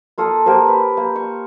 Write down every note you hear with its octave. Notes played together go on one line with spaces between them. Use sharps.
A#3 F4 A4 D#6
A#3 G4 A#4 C5
B4
A#3
C#6